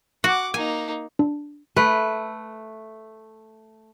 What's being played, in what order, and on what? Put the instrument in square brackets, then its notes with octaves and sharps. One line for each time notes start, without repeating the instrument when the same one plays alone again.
[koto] F#4 [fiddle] F#5 D6
[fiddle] A#3 D#4 [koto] G#5
[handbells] D4
[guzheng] A3 [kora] B4